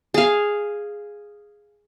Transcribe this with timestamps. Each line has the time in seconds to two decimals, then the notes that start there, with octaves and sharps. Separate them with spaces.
0.14 G#4 F5